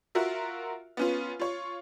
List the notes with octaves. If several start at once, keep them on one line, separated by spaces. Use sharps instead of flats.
F4 F#4 A#4 E5
B3 C#4 F4
F4 C#5